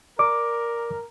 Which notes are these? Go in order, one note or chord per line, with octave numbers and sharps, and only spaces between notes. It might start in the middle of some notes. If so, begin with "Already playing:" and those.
A#4 D5 D6